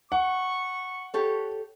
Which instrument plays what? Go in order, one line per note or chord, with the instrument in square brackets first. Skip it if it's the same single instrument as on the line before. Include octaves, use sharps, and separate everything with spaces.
[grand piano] F#5 [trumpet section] C#6
[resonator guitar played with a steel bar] G4 A4 C#5